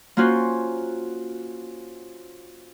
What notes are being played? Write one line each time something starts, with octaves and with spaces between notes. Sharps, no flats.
A#3 C#4 F4 F#4 C5